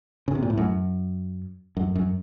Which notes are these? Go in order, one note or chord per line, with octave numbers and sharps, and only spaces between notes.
C#3
C3
A#2
A2
F#2
F#2
F#2